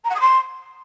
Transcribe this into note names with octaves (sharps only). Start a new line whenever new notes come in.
A#5
F#5
D#6
C6